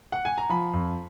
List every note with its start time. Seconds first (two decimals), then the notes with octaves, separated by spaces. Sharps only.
0.12 F#5
0.25 G#5
0.38 A#5
0.49 F3 B5
0.73 F2